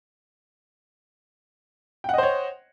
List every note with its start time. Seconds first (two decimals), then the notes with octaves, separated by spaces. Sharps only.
2.04 G5
2.09 F#5
2.14 D#5
2.18 C5
2.23 C#5